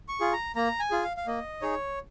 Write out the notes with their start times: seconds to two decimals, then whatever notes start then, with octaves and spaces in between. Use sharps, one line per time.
0.08 C#6
0.20 F4 G#4
0.33 A#5
0.56 A#3 A#5
0.79 G#5
0.91 F4 G#4
1.03 F5
1.17 F5
1.27 A#3 D#5
1.62 D#4 G#4 C#5